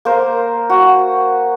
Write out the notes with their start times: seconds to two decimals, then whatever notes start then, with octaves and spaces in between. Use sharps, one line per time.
0.05 A#3 A#4 C5
0.69 F#4